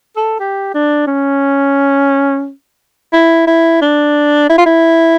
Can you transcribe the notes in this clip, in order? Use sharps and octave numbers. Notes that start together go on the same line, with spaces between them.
A4
G4
D4
C#4
E4
E4
D4
E4
F4
E4